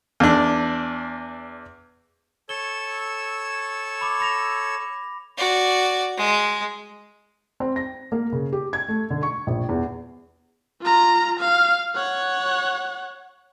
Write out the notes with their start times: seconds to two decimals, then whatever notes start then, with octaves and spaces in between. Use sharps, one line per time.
0.20 E2 D4
2.49 A4 C#5 E6 G7
4.01 B5 D6
4.20 B5 A#6 F7
5.38 F#4 D5
6.17 G#3
7.60 C4
7.76 A#6
8.12 A#3
8.32 C#3
8.53 G4
8.73 G#6
8.89 A3
9.10 D3
9.23 C#6
9.47 A#1
9.69 E2
10.81 F4 A#5
11.40 F5
11.96 C#5 F#5